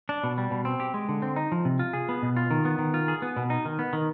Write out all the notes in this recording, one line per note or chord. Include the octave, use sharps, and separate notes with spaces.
D4
B2
G3
B2
C4
G4
G#3
D3
C4
D#4
F3
C3
F4
G#4
B3
B2
F4
D#3
B3
D#3
F4
G#4
B3
B2
D#4
D#3
B3
D#3